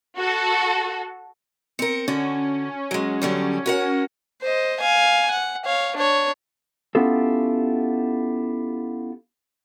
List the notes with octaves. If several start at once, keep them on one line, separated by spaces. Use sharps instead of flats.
F#4 A4
C4 A#4 C#7
D3 C#4 F#4
F#3 G#3
D3 F#3 G3
F#4 A#4 F#5
C5 D#5
F5 G#5
F#5
C#5 F5
D4 C#5
B3 C#4 E4 F4 G4 A4